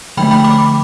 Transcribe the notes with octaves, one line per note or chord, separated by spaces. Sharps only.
D3 F3 A3 G5 B5
G5 B5
B5 D6